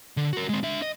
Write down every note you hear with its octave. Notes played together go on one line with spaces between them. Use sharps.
D3
F#4 A#4
G#3 C4
D4 E5
D#5